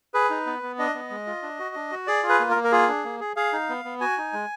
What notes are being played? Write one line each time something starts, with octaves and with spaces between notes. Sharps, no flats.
G#4 B4
D#4
B3
B3
D4 D#5
B3
G#3
F4
D4
F#4
D4
F#4
G#4 D5
F4
B4
A#3
A#4
A#3
A#4
F4 G#4
D4
A#3
G#4
G#4 F5
D#4
B3
B3
F#4 G#5
D#4
G#3